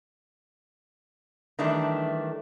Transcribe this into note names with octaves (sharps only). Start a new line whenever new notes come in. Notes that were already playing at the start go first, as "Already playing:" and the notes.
D#3 E3 G3 A3 D4